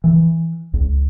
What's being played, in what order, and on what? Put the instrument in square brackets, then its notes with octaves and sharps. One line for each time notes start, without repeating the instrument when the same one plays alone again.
[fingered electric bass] E3
C#2